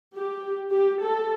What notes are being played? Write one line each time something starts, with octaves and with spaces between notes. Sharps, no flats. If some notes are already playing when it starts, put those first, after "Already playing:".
G4
G4
A4